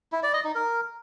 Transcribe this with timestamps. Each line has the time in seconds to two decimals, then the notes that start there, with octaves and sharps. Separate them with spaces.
0.12 E4
0.23 D5
0.34 D#5
0.44 D#4
0.55 A#4